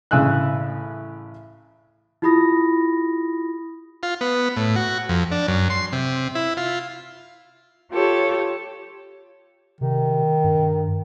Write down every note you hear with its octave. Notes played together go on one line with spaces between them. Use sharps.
A1 C#3 G#5 E6 F#6
E4 F4 G4 B5 D#6 A#6
F4
B3
A2
F#4
F2
D4
F#2
C6
C3
E4
F4
F4 G4 A4 C#5
C3 D#3
G2